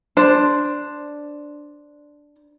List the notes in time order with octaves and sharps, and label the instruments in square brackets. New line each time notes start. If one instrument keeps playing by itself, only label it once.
[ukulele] D4 C5